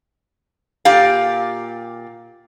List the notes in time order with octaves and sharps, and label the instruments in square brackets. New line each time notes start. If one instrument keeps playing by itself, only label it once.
[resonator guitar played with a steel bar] A#2 G4 F5